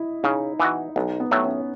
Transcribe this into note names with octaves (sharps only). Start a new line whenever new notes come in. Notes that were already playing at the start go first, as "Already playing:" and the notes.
Already playing: E4 D#5
C#3 D#4
E3 B3 F#4
B1 D#4
B3
A2 F#3 A3
C#4